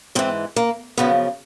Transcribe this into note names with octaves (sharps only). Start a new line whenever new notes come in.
G#2 E3 C4
A#3
F#2 C#3 F3 B3